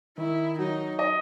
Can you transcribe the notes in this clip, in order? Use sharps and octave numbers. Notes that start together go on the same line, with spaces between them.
D#3 E4
F#3 D#4
D#5